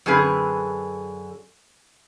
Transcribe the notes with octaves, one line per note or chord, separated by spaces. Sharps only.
F#2 D3 C4 G#4 B4